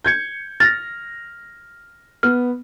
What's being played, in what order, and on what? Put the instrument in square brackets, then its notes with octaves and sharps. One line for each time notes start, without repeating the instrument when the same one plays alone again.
[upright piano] G6 G#6 C#7
[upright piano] F6 A#6 [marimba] A6
[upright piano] B3 [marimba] F6